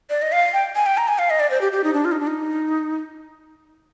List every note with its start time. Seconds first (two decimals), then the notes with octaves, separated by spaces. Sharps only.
0.10 D5
0.22 D#5
0.32 F5
0.53 G5
0.76 G#5
0.86 G5
0.98 A#5
1.08 G#5
1.19 F5
1.30 D#5
1.40 D5
1.51 C5
1.61 G4
1.72 G4
1.84 D#4
1.94 D4
2.05 F4
2.12 D#4
2.20 D4
2.27 D#4